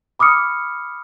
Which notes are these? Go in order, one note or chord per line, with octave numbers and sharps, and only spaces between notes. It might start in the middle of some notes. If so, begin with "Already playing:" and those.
B5 D6 D#6 F6 C#7